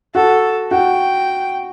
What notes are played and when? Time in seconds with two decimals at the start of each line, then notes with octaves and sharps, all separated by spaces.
0.15 F#4 A4
0.71 F#4 G5